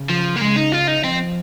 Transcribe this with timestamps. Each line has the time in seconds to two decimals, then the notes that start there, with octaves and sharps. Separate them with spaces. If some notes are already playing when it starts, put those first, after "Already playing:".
Already playing: C#3
0.10 F3
0.37 A#3
0.41 C#3 G#3
0.56 D#4
0.72 F4
0.88 D#4
1.03 F3 C4